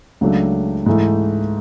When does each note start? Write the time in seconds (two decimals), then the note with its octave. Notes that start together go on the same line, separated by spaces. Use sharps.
0.21 C#2 C#3 F#3 A3 D4
0.86 G#2 E3 A3